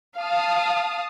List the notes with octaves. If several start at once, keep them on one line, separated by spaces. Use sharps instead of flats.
F5 A5 D#6